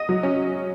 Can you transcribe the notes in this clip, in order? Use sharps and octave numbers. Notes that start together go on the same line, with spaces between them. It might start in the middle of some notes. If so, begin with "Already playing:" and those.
Already playing: D#5
F#3
C#4